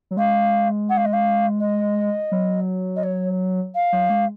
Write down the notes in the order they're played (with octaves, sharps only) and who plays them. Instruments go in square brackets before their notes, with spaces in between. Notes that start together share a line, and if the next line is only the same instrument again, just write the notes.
[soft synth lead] F#3
[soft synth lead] G#3 [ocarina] F5
[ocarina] F#5
F5
D#5
F5
D#5
[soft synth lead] F#3
[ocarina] D#5
C#5
F5
[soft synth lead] F#3
G#3